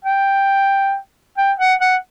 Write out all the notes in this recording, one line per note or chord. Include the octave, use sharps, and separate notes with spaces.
G5
G5
F#5
F#5